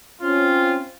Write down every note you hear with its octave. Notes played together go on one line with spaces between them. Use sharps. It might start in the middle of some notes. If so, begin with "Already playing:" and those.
C4 C#4 F4